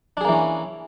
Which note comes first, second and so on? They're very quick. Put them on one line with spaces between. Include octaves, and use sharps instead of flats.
D4 G#4 A#3 E3 C#4